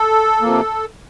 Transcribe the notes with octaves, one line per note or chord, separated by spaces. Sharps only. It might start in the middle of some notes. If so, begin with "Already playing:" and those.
Already playing: A4
C3 F3 A#3